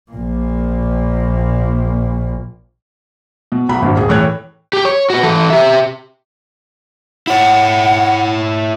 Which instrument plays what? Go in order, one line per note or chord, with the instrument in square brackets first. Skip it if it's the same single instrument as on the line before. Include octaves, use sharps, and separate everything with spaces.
[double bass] A#1 A#2
[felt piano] B2
B1 B2 A#5 B5
G#1 G2 A#2
D#1 G#4
A2 E3 C#5 G5 F#6 G#6
[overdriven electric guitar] G4
C#5
B3 F#4
E3 A4
G4 E5
[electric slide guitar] E4 C#5 [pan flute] F#5